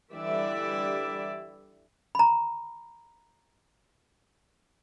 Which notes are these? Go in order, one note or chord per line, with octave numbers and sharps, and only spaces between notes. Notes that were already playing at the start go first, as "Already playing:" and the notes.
D3 E3 G3 E4 D5 E5
A#5 B5